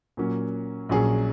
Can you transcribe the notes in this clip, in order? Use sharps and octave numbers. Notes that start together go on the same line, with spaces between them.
A#2 F#3 A#3 C#4
A#1 A#2 F#3 C#4 G#4